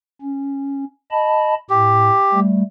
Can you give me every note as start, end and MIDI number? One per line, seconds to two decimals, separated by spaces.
0.22 0.85 61
1.11 1.54 75
1.11 1.54 81
1.11 1.54 83
1.70 2.10 45
1.70 2.40 67
2.32 2.62 55
2.32 2.62 57